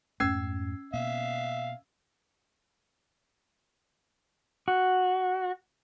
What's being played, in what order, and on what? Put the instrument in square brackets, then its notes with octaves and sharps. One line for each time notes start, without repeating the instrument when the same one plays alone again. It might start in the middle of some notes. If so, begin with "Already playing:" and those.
[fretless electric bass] F2 G#2 A3 [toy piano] C#4 [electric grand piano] E6 G#6 C7
[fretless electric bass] B2 A#3 B3 [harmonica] E5 F5
[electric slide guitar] F#4